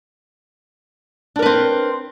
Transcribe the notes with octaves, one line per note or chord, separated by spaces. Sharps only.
C4 D4 A#4 B4